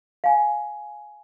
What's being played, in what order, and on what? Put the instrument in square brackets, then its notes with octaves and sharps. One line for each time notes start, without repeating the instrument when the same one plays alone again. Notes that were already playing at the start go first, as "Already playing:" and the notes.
[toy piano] F5 G#5